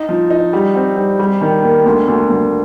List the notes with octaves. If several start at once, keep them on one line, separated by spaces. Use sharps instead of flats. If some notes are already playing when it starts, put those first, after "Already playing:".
Already playing: D#4
F3
D#4
G3
C4
G3
G3
D#3
A#3
D2
D2
D2